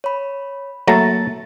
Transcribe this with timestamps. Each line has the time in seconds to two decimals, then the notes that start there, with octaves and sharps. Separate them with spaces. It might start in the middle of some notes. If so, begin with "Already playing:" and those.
0.04 C#5 B5
0.88 F#3 A3 A#3 A#5 A6